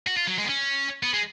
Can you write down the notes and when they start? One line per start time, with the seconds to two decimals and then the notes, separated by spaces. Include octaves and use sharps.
0.07 F#4
0.17 F4
0.28 F#3
0.38 G#3
0.44 B3
0.49 C#4
1.03 B3
1.13 G#3